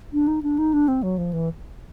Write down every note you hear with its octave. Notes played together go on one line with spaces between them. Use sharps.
D4
D#4
D4
D#4
D4
C4
F#3
F3
E3